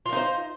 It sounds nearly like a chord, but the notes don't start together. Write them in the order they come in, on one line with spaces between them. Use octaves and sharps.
F4 A#4 D#4 C5